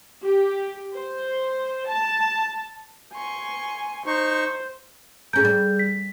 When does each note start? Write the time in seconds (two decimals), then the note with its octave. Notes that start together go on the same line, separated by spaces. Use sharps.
0.23 G4
0.93 C5
1.88 A5
3.15 G#5 C6 C#6
4.07 D#4 C5 C#6
5.33 A2 C#4 G#4 A#4 G6
5.45 G3
5.79 B6